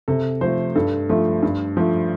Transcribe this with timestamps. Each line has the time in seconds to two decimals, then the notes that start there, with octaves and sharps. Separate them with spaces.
0.08 C3 A4
0.41 F3 A3 C5
0.75 G2 A4
1.09 F3 A3
1.42 G2
1.77 F3 A3